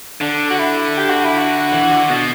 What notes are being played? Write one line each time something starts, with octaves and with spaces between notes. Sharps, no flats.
D3 D4
F#4
E4
G4
F#4
E4
F#4
E3
D3
B2